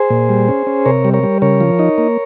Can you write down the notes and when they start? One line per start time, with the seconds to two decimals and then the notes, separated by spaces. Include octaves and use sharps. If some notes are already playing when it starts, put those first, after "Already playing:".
Already playing: G#4 C5
0.10 A#2
0.29 G3
0.48 C#4
0.67 C#4
0.85 C3 A#4 C#5
1.05 G3
1.14 A#4 C#5
1.23 G3
1.42 C#3 A#4 C#5
1.60 F3
1.79 D#4
1.98 A#3